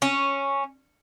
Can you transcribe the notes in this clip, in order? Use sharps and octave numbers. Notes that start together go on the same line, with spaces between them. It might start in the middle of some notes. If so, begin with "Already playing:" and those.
C#4